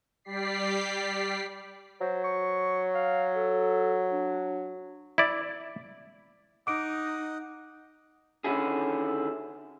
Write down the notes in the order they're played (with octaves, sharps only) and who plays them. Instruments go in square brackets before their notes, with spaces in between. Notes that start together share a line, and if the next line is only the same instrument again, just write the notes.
[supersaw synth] G3 G4 D5 B6 C7
[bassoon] F#3 [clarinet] C5
[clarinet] C#6
F5
A4
D4
[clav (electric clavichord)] E4 D5
[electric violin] D#4 [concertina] D#5 F#5 [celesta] D6 D7
[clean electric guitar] D3 D#3 C#4 E4 F#4 G#4